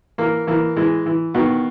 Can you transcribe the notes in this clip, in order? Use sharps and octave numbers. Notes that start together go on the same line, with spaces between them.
E3 A#3
E3 A#3
E3 G#3
E3
B2 D#3 B3